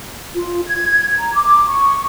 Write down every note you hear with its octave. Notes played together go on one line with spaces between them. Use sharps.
F4
G#6
A#5
D6
C#6